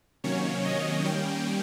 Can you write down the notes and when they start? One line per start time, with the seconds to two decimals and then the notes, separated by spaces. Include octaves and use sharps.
0.24 C3 D#3 F#3 A#3 C#4 C#5
0.65 D#5
1.05 D#3 G3 A#3 C#4 G5